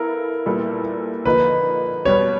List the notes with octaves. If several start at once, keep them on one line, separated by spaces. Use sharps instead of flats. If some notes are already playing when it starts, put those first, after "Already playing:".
Already playing: B3 E4 A4 A#4 F5
A#2 G3 B3 E4 A4
D3 F3 A#3 D#4 B4
B2 G3 B3 C#5